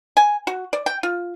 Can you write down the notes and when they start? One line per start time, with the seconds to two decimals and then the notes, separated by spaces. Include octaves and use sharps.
0.17 G#5
0.47 F#4
0.73 D5
0.86 G5
1.03 F4